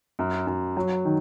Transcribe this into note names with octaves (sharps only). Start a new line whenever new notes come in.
F#2
F#2
F#3
D#3